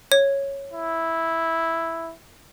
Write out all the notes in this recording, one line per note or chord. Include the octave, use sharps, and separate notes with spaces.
C#5
E4